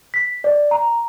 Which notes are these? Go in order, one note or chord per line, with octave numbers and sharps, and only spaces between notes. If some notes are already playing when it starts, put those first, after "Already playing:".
B6
D5
A#5